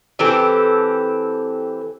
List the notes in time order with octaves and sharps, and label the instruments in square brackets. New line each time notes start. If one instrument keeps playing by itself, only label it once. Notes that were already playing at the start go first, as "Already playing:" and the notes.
[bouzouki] E3 C4 G4 A4